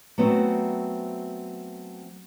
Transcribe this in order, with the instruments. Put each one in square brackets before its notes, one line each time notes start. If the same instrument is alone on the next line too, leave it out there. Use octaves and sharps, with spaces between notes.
[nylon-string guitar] F#3 A3 B3 C4 F#4